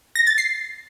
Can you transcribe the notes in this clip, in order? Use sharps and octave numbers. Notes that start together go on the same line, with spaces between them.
A#6
A6
C7